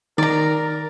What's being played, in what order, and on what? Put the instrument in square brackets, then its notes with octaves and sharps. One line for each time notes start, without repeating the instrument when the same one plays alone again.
[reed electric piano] D#3 [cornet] A#4 [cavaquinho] D5 A#5